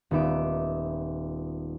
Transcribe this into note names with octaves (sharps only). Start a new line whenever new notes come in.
D#1 B3 D#4 E5 D6